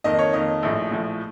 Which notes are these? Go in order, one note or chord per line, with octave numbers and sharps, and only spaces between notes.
F2 D#3 A#3 D#5
C#5
F2 D#3 A#3 D#5
A#1 A2 F3
A#1 A2 F3